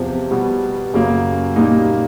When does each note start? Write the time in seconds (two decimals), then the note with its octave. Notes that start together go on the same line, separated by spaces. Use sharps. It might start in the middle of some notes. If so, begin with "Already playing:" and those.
Already playing: E2 C3 F3
0.31 B2 G3 B3
0.94 F#2 C#3 F#3 A#3
1.56 A#2 G3 A#3 D#4